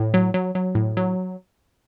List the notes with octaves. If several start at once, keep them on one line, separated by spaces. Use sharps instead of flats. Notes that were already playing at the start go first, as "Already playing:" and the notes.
Already playing: A2
F#3
F#3
F#3
A2
F#3